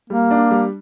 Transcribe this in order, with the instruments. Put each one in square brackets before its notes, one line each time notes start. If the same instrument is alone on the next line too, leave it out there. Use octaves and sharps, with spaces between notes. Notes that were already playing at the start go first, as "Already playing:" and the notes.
[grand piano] G3 [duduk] A#3
[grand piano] D4
G3